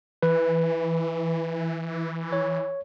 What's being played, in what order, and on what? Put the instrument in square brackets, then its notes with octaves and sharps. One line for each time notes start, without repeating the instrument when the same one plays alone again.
[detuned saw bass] E3 [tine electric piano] B4
[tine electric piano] C#5